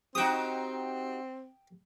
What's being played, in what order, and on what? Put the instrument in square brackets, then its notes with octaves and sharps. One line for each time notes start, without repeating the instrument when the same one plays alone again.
[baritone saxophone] C4 [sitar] D#4 F#4 G4 [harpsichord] G5 D#6